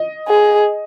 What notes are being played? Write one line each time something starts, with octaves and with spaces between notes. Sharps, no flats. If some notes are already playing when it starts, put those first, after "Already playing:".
Already playing: D#5
G#4